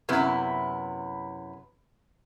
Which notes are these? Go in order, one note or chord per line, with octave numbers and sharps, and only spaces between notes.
F#2 C3 B3 E4